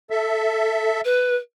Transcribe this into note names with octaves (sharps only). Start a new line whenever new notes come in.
A4 E5
B4